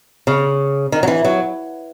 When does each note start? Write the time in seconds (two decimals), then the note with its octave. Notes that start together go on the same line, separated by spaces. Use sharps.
0.27 C#3
0.92 D#3
1.03 F#3
1.08 E3
1.25 F#3